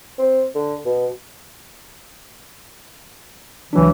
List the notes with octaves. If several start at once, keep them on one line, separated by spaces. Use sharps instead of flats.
C4
D3
B2
C#2 E3 F#3 D4